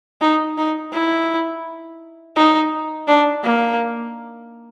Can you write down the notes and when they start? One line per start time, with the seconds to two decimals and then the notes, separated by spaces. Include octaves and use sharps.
0.21 D#4
0.58 D#4
0.93 E4
2.36 D#4
3.08 D4
3.44 A#3